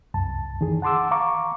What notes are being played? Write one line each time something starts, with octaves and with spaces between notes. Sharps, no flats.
C2 F#2 A5
D#3 E3 G#4
F#5 A5 C6 D6 E6
F5 A#5 C#6 D6